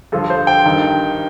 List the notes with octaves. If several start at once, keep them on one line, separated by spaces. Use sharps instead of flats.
G2 D3 F3 A4
C5
G5
G2 D#3